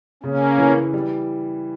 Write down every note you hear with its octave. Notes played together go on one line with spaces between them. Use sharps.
C#3 A#3 C#4
E3
G3